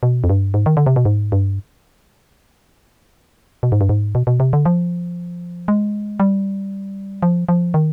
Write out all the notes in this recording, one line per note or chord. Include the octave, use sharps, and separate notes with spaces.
B2
F2
G2
G#2
D#3
D3
C3
B2
G#2
G2
B2
G#2
G2
G#2
B2
B2
C3
D3
F3
G#3
G3
F3
F3
D#3